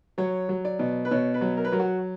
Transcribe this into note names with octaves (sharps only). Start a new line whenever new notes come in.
F#3 C#5
F#3
D5
B2
B4
B2 C#5
B4
F#3
A#4
B4
F#3 A#4
F#4